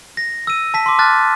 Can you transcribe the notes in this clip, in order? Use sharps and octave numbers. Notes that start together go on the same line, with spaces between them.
A#6
E6 D#7
A5 B6
C6 D6
A5 D6 F6 F#6 A6